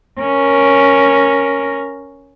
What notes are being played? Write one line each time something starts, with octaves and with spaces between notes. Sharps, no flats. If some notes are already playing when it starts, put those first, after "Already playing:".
C#4 A#4